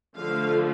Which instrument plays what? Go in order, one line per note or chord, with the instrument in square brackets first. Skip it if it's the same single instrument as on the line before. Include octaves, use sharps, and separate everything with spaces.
[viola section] D3 F3 A3 F5